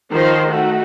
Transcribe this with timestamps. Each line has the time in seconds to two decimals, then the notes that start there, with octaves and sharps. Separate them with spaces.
0.11 D#3 F3 D#4 C5
0.46 A3 D#4 F#4